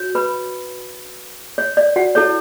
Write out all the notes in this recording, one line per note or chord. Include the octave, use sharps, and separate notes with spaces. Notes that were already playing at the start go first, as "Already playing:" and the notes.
Already playing: F#4 C#5
B4 B5
C#5
D5
F#4 F#5
E4 A4 C#5